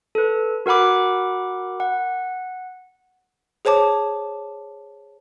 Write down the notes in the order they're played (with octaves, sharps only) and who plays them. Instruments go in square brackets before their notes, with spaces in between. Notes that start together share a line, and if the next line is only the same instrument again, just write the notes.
[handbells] A4 B4
F#4 A#4 F#5 B5 D6
F#5
[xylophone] G#4 C5 C#5 A5 D6